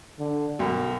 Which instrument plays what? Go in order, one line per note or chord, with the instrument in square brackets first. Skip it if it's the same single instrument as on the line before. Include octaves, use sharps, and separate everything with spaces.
[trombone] D3
[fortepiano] B1 F#2 [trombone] F#4